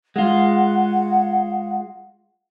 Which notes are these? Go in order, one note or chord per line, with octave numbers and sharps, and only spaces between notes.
G#3 F4 F#5